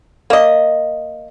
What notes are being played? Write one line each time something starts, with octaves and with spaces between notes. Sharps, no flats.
A#3 D#5